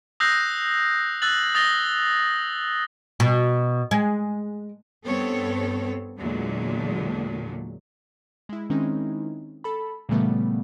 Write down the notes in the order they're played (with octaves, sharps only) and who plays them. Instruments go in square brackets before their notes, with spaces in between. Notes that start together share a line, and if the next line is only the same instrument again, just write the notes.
[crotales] D#6 E6 F#6 G6 A#6 C7
E6 F#6 A6 F#7
D#6 A6 A#6 G7
[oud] B2
G#3
[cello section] G2 B3 C4 A4 C#5
E2 A#2 D3 F#3 G#3
[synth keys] G#3 E4
D#3 G#3 C4 C#4 D#4 E4
A4 B5
A#2 C#3 E3 G3 A3 B3